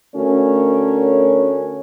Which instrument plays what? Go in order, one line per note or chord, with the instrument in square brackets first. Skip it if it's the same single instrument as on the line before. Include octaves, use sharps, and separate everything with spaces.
[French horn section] D3 A3 C#4 F#4 A#4 C#5